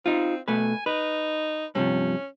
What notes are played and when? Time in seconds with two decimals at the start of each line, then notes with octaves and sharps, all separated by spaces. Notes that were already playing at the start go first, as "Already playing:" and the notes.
0.06 C4 D#4 F4
0.48 B2 A3 B4 G#5
0.86 D#4 B4
1.75 G2 C3 F3 C#4